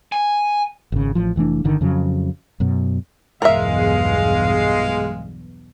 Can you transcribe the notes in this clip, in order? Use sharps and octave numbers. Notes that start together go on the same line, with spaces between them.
G#5
G#1 C#3
A1 F3
F1 E3 A3 D4
G1 D3 D#3
F2 C#3 F#3
F#2 B2
B1 E2 G2 G#3 A#4 E5 F5